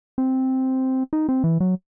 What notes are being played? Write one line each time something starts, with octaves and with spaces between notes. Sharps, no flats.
C4
D#4
C4
E3
F#3